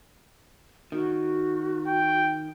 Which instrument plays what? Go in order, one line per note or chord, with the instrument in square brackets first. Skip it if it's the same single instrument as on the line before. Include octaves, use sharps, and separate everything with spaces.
[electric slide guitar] D#3 [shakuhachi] F#4
[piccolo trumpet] G5